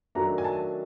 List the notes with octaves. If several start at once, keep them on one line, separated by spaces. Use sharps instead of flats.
D#3 F#3 A3 D4 A#5
G#5
A5